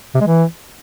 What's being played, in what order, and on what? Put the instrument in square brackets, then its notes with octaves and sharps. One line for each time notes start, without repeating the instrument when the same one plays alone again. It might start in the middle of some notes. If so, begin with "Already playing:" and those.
[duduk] C3
G#3
E3